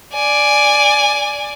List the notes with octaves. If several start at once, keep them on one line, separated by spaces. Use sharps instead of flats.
D5 G#5